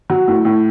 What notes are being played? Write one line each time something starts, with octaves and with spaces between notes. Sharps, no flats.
F#3
A2
A2